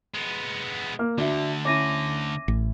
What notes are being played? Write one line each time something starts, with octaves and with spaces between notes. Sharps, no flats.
G#3 B3
A#3 A#4 F6
D2 D3 D4 F#4 E5
C#4 E4 D6 A#6 D#7
A1